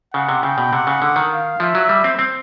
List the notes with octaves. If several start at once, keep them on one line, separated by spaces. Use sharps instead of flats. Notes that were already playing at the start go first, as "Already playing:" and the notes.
C#3 F#5
C3
C#3 G5
B2
C3 F#5
C#3
D3
D#3
F5
F3 E5
F#3
G3
C4
C4